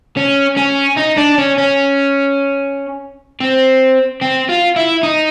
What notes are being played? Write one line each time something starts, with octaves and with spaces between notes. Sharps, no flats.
C#4
C#4
D#4
D4
C#4
C#4
C4
C4
F4
E4
D#4